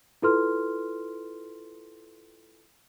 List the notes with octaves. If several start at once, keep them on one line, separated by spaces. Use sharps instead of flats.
E4 F4 A4 B4 C6 F6